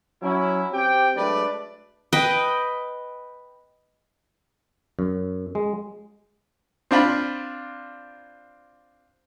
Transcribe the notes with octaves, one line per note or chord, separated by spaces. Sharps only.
F#3 C#4 E4
C4 G4 G5
F#3 G#3 A3 D4 B4 D5
B4 D#5 G5
F#2
G#3
C4 D4 F4 B5